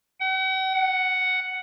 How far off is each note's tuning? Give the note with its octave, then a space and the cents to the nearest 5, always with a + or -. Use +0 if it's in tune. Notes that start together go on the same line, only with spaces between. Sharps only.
F#5 +45
F#5 +5